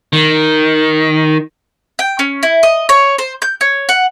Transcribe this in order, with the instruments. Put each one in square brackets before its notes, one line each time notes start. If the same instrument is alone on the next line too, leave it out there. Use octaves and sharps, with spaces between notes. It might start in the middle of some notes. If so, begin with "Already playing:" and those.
[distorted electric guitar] D#3
[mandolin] G5
C#4
E4
D#5
C#5
C5
G6
C#5
F#5